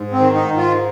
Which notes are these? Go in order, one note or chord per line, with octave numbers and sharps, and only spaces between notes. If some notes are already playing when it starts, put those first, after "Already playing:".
Already playing: G#2
C4
D#3
D#4
G#2
F4